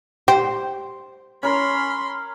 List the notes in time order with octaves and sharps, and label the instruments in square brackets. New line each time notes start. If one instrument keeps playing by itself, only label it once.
[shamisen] G4 [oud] C5
[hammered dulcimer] C#4 A#4 [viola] B5 C6